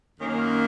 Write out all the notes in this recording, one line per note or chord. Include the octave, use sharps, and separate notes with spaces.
F#2 D#3 A#3 C#4 A#4